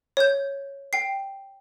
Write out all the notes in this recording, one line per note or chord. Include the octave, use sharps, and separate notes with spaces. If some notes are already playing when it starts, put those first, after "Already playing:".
C#5 G6
G5 C7